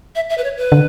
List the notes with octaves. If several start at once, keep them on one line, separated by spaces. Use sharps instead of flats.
E5
E5
B4
C#5
B4
D3